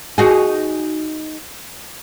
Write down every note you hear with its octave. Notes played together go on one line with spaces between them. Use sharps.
D#4 F#4 G#4